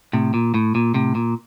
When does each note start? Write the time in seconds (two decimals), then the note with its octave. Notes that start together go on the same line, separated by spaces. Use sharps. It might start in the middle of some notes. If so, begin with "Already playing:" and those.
0.13 A2 C3
0.34 A#2
0.54 A2
0.75 A#2
0.94 A2 C3
1.15 A#2